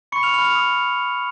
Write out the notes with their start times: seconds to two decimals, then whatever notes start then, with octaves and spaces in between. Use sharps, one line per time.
0.12 B5 C#6 C#7
0.23 F6 F7
0.34 B5 F6 F7
0.44 F6 F7
0.55 D#6